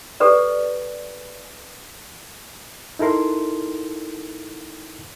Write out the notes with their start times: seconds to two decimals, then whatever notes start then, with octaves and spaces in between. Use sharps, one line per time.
0.20 G4 A4 B4 D5
2.99 D#4 E4 A4 A#4 C6